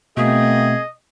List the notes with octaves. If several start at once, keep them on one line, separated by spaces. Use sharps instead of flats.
B2 A3 A#3 C4 G#4 D#5